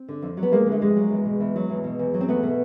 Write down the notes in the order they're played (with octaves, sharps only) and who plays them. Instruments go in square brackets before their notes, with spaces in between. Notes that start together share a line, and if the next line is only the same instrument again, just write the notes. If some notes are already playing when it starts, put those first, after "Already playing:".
Already playing: [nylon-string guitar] C4
D3
F2
F#3
B3
F2 G#3 A#3
D3
A3
F2 G#3
F#3
E2
B2
E2
F#3
E2
B2
E2
F#3
C4
E2 A3 B3
B2